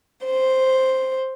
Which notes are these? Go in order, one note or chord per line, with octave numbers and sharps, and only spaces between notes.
C5